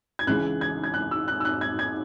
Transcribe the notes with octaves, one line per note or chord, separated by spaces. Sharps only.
G#6
C#2 C#3 E3 F#6
G#6
G#6
F#6
E6
F#6
E6
F#6
G#6
G#6